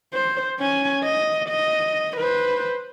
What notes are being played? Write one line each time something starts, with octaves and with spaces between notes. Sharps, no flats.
C5
C#4 G#5
D#5
D#5
B4 C5